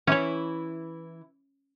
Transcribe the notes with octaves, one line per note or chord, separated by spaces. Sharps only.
E3 C#4 E4 C#5